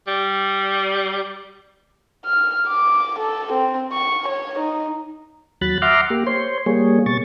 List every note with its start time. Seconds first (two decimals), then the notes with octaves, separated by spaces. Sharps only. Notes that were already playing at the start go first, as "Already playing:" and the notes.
0.07 G3
2.25 F6
2.68 D6
3.19 A4
3.53 C4
3.92 C#6
4.28 C#5
4.59 D#4
5.61 D#2 F#3 B5 F#6 A6
5.82 E5 F#5 A#5 C6 D6 F6
6.10 A#3 G4
6.26 C5 C#5 C6
6.66 G3 A#3 G#4 C#5
7.06 B2 C#6 A6